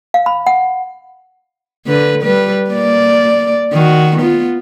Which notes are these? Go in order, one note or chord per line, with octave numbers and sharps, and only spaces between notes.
F5
B5
F#5
D3 B4
G3 B4
A#3 D5
D#3 F#4
B3 F4